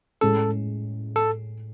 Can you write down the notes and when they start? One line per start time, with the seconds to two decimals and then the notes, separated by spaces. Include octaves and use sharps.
0.21 A2 G#3 C#4 G#4 A4
1.16 A4